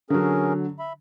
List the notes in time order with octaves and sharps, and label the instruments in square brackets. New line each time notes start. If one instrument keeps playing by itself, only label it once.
[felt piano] D3 F#3 [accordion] C#4 G#4 A#4
[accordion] E5 B5